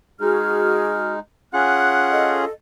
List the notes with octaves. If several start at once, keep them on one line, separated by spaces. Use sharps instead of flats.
G#3 D#4 F#4 G#4 F6
C#4 F4 G#4 F#5 F#6
A4 D#5